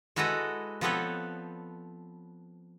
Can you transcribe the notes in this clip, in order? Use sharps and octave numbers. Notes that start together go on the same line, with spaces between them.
G#3 E4 F#4 A4 B4 D#5
F3 B3 C4 A4 B4 C#5